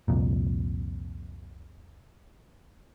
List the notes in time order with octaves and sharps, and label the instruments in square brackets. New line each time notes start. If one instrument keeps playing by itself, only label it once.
[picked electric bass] C2 F2 A#2